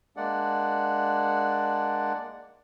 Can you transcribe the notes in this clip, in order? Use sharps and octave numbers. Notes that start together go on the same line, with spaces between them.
G#3 A#3 D4 D5 F#5